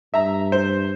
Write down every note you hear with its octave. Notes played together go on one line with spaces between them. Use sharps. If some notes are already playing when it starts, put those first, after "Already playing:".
G2 E5 A#5
C5